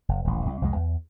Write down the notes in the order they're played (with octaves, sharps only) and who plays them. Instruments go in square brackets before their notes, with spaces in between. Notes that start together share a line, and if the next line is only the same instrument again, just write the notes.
[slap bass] F#1
D#1 A1
C2
C2 F2 F3 G#3
E2